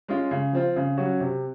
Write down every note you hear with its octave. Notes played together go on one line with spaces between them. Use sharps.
G#3 C#4 F4
C#3
F3 C4 F4
C#3
F#3 C#4 F#4
C3